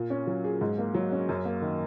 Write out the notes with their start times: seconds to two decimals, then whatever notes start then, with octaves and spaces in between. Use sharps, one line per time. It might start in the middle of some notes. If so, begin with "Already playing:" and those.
Already playing: A#2
0.10 C#4
0.27 F#3
0.44 G#4
0.61 G#2
0.79 A#3
0.94 F#3
1.12 C#4
1.29 F#2
1.45 A#3
1.62 D#3